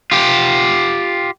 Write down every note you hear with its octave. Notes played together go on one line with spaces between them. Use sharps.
F4 G4